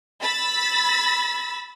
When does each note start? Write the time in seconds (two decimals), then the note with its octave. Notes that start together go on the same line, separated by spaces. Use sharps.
0.21 B5 E6 A6 B6